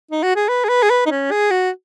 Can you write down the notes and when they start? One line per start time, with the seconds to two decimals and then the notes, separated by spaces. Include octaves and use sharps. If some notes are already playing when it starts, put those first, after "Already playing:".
0.11 D#4
0.23 F#4
0.36 G#4
0.49 B4
0.65 G#4
0.69 B4
0.83 G#4
0.90 B4
1.06 D#4
1.11 C#4
1.31 G#4
1.51 F#4